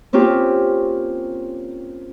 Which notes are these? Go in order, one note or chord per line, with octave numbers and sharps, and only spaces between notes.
A#3 C4 C#4 F4 G4